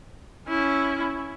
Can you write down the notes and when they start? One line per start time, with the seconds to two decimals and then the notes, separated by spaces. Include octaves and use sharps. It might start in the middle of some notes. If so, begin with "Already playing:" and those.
0.48 C#4 E4